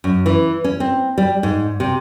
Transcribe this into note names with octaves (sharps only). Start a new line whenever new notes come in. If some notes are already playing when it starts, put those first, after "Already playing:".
F#2
E3
C#4
C4
G3
G#2
C3